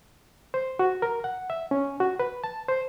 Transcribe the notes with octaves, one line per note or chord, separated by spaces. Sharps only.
C5
F#4
A#4
F#5
E5
C#4
F#4
B4
A5
C5